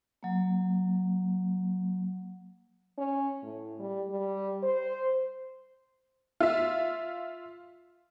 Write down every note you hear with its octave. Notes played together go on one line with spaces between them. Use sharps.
F#3 A#3
C#4
A2
G3
G3
C5
F4 E5